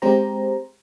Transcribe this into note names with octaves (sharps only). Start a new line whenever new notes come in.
G#3 C4 G4 C5 A#5